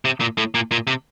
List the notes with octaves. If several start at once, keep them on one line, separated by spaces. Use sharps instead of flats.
C3
A#2
A2
A#2
A#2
C3